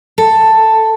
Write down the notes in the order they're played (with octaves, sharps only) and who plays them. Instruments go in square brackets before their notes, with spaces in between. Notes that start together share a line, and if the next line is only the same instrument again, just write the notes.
[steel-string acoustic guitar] A4